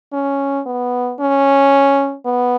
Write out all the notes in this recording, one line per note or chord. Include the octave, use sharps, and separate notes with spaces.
C#4
B3
C#4
B3